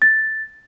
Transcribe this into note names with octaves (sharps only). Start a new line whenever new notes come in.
A6